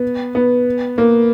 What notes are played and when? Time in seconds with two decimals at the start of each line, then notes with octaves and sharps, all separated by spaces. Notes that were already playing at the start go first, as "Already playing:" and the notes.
Already playing: B3
0.35 B3
0.98 A#3